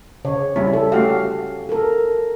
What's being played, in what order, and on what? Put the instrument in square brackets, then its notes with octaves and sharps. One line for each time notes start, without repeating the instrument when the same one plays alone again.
[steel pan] C#3 [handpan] C#5
[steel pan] G3 E4 [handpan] C#4
[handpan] A4
[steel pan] A3 F#4 G4 [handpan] F5
[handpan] A4 A#4